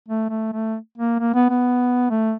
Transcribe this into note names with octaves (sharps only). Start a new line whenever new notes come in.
A3
A3
A3
A#3
A#3
B3
B3
A3